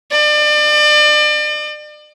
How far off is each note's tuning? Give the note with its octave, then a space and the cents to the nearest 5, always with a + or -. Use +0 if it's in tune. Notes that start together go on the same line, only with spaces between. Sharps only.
D5 +35